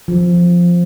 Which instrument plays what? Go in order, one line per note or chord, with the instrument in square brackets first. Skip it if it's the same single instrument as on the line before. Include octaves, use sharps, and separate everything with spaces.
[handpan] F3